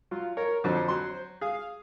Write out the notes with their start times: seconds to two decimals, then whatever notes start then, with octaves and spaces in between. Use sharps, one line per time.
0.11 F#3 F4
0.37 A#4 C#5
0.64 F2 D3 F#3 C5
0.88 F#3 C6
1.41 G#4 F5